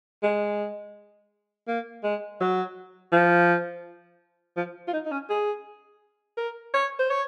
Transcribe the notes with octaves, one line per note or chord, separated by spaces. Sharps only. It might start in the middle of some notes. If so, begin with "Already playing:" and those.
G#3
A#3
G#3
F#3
F3
F3
F4
D#4
D#4
C#4
G#4
A#4
C#5
C5
C#5